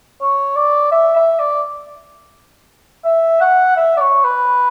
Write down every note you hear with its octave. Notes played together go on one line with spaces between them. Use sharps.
C#5
D5
E5
E5
D5
E5
F#5
E5
D5
C#5
B4